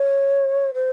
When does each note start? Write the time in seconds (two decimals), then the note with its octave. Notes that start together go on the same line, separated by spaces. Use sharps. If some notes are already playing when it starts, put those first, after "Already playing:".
Already playing: C#5
0.74 C5